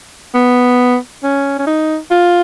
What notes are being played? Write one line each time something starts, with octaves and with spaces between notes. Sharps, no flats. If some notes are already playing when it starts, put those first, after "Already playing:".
B3
C#4
C#4
D#4
F4